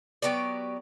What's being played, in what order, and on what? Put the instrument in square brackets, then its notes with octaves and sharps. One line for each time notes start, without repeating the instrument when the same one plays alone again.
[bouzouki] F#3 B3 G4 D5